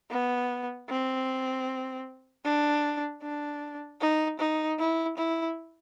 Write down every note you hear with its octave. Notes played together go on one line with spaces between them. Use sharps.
B3
C4
D4
D4
D#4
D#4
E4
E4